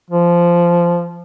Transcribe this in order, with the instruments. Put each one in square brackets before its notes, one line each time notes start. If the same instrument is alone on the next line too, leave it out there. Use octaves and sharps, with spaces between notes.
[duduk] F3